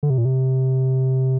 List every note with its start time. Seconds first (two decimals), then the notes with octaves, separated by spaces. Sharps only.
0.03 D3
0.10 C3
0.18 A#2
0.25 C3